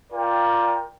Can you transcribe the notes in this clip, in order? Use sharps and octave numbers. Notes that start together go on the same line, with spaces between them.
F4 A#4 D5 G5